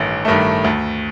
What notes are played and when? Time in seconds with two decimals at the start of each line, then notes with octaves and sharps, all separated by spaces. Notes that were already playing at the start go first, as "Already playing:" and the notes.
Already playing: A1 G2 D#3 A3
0.25 G2 D#3 A3
0.64 D2